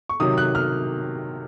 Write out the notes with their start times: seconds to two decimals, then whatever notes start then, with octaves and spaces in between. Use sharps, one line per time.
0.09 C#6
0.20 C3 D#3 F#3 D#6
0.38 F#6
0.55 F6